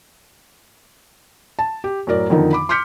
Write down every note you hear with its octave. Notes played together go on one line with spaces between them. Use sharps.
A5
G4
F#2 A2 A#4 D5
F2 D3 D#3 F3 A#3 D#4
B5 D6
C6 D6 F6 G6 B6 C#7